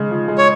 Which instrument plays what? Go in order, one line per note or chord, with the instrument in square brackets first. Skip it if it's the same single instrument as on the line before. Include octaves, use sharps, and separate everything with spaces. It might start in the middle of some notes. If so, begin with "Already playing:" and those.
Already playing: [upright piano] C#3 G#3
F3
G#3
[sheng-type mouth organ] C#5